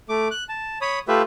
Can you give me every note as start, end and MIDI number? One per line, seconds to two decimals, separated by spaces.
0.09 0.28 57
0.09 0.28 86
0.31 0.44 90
0.49 0.78 81
0.81 0.99 73
0.81 0.99 83
0.81 0.99 87
1.08 1.22 57
1.08 1.22 65
1.08 1.22 67
1.08 1.22 71
1.08 1.22 76